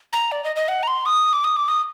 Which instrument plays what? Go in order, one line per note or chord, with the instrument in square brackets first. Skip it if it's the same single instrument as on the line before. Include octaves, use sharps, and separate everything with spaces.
[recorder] A#5
D5
D#5
D#5
F#5
A#5
C6
D#6
D6
D#6
D6
D#6